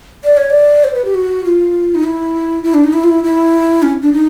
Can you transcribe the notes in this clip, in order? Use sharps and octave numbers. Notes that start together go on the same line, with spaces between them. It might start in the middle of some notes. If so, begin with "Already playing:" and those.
D5
C#5
D5
C5
B4
G4
F#4
F4
D#4
E4
E4
D4
D#4
E4
F4
E4
E4
C#4
D4
D#4